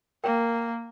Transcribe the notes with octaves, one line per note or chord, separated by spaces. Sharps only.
A#3 A#4 G5